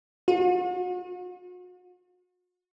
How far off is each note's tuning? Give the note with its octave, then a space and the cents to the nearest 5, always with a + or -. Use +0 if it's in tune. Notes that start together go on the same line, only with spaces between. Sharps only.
F#4 -40